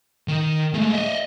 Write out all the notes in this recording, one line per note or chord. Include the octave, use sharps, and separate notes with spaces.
D#3
G#3 A3
D#5 E5